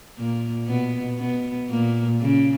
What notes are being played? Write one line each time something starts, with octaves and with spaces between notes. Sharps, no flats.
A#2 A#3
B2 B3
B2 B3
A#2 A#3
C#3